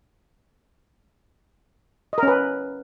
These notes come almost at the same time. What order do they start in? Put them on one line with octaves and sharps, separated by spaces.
D#5 A#4 C#4 B4